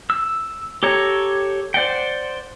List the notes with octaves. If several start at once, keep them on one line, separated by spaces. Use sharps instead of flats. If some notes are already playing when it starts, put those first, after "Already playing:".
E6
G4 A4 C#5 A#5
C5 D5 F#5 G5